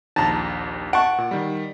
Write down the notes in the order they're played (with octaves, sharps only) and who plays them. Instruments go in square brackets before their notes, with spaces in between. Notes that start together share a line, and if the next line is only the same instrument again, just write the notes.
[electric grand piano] A#1 D#2 [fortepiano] A5 A#5
[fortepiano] F#5 A5 C#6 [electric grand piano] D7
[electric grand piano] A#2
D#3 G3